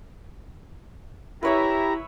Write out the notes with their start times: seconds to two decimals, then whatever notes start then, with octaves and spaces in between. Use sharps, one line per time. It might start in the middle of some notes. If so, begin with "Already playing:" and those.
1.43 E4 G4 B4 C#5 E5 A#5